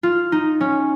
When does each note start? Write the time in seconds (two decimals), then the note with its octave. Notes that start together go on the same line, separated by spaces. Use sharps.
0.03 F4
0.32 D#4
0.61 C#4